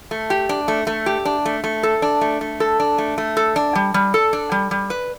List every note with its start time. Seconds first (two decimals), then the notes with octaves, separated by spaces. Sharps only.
0.11 A3
0.30 G4
0.49 D4
0.68 A3
0.87 A3
1.06 G4
1.25 D4
1.45 A3
1.64 A3
1.83 A4
2.02 D4
2.21 A3
2.41 A3
2.60 A4
2.80 D4
2.98 A3
3.18 A3
3.37 A4
3.56 D4
3.75 G3
3.94 G3
4.14 A4
4.33 D4
4.52 G3
4.71 G3
4.90 B4